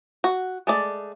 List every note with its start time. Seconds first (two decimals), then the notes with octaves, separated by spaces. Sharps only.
0.24 F#4
0.67 G#3 A3 D5